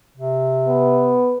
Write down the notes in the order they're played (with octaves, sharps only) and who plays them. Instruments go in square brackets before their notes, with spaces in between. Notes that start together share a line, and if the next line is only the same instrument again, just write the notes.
[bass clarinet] C3
[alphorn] B3